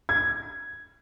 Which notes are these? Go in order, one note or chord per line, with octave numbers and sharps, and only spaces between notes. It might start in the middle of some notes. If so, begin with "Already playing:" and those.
G#6